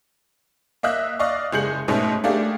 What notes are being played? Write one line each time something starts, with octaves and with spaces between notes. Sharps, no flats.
A#3 D#5 E5 F#6
D5 D#5 F5 C#6
F#1 G#3 G#4 G6 C#7 F#7
G#2 B2 G#3 A3 C#4
A3 A#3 D4 G4 G#4